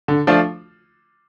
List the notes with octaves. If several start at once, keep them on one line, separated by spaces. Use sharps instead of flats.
D3
F3 A3 D4 F4